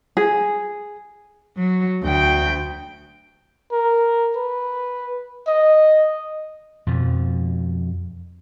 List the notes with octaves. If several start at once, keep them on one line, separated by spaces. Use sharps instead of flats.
G#4
F#3
D2 G5
A#4
B4
D#5
F2 B2 F3